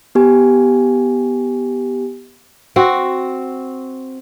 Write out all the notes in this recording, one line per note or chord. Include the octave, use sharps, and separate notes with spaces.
B3 G4 G#5
C4 F#4